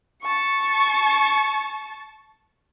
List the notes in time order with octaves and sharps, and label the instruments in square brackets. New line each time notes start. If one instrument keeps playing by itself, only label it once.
[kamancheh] A5 C#6